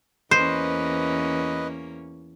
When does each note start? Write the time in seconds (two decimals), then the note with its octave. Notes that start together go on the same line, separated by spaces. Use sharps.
0.31 E2 A#3 C#4 B4 C5 D#5